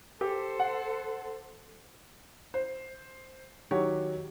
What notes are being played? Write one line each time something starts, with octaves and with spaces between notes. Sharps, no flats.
G4 A4 C5
F#5
C5
D#3 F#3 F#4 G4 C#5